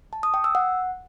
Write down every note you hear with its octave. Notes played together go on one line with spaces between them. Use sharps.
A5
D#6
G5
E6
F#5